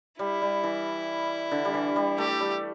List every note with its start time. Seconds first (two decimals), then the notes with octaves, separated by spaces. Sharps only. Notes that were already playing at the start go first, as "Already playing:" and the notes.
0.19 G3 E4
0.42 G3
0.64 E3
1.51 D3
1.65 G3
1.74 E3
1.96 G3
2.18 A3 G4
2.40 G3